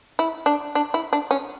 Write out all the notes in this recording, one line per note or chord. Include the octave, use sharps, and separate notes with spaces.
E4
D4
D4
E4
D4
C#4